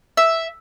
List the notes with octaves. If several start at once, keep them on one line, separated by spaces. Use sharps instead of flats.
E5